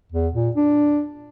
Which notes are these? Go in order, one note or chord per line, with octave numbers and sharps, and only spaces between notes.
E2
A#2
D4